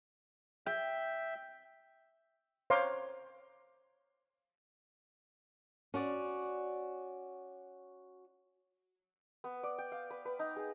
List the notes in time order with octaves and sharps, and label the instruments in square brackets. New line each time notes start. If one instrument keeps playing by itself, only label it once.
[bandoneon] E5 [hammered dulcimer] G5
[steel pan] C5 C#5 F5 A#5 C6 D6
[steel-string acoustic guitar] C#4 F#4 D5
[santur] B3
D5
G5
F5
B4
B4
D#4
G#4